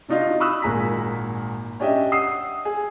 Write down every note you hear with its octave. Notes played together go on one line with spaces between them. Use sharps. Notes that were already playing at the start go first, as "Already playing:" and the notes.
C3 D4 D#4 F4 F#4
B5 C#6 D#6 E6 F#6
G#1 A#2 G#4 A#5 B6
C#4 D4 G4 D#5 E5
F#5 D#6 E6 C7
G#4